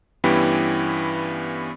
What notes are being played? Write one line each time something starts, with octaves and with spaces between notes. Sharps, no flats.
G2 E3 B3 C#4 E4 G4